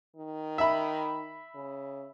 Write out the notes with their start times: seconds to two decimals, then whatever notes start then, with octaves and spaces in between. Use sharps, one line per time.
0.16 D#3
0.58 E5 B5
1.55 C#3